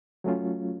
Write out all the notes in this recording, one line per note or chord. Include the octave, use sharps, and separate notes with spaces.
F#3 A3 C#4 F4